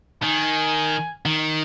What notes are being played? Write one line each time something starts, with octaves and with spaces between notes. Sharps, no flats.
D#3 G#5
D#3